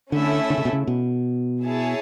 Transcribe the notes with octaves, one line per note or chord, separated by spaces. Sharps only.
D3 A3 C#4 E4 A4 E5
D3
C#3
B2
C#3
B2
E4 G#4 C#5 E5 A5